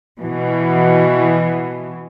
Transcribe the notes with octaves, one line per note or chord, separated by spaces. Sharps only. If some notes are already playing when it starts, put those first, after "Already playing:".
B2 E3